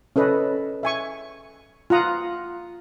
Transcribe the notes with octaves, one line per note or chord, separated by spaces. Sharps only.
C#4 A4 B4 D#5
E5 G#5 C#6
F4 F#5 A#5 D#6